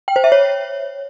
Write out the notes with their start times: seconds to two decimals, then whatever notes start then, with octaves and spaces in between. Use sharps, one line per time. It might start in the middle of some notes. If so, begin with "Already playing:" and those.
0.08 G5
0.16 C5
0.24 E5
0.32 C#5